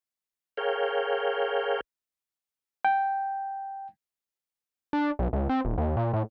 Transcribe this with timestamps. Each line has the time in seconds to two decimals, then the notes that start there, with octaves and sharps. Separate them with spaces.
0.57 G#4 A#4 C#5 F5 G5
2.85 G5
4.93 D4
5.19 B1
5.33 C#2
5.49 C4
5.65 D#1
5.78 D#2
5.97 A#2
6.14 A2